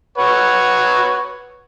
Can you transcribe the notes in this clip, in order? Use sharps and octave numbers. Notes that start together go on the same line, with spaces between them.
B4 C#5 F#5